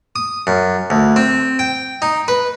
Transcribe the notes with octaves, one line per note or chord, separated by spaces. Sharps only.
D#6
F#2
D2
C4
G5
D#4
B4